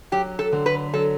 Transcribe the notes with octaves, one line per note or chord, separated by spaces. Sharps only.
F#3 G4
A4
D3
B4
F#3 A4